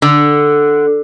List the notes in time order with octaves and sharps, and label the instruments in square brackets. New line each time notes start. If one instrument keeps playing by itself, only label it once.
[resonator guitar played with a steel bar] D3